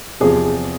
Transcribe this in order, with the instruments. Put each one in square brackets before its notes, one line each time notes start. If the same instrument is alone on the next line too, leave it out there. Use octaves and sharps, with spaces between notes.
[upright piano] E2 C3 F3 G#4